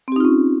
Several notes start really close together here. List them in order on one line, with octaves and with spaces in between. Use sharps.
C4 G4 D#4 F4 C#4